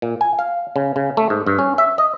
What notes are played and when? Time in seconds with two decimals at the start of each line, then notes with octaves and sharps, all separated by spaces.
0.02 A#2
0.21 G#5
0.39 F5
0.76 C#3
0.96 C#3
1.17 A3
1.30 G#2
1.47 G2
1.59 C#4
1.78 E5
1.98 D#5